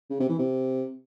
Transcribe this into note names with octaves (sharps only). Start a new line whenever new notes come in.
C#3
C3
E3
C3